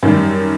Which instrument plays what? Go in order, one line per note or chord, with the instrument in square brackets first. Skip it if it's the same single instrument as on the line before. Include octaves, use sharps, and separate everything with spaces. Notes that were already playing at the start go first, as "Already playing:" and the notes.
[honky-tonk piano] F#2 D#3 G3